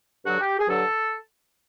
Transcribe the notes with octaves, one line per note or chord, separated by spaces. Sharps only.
G2 D3 F#3 F#4
G4
G#4
G2 D3 F#3 A4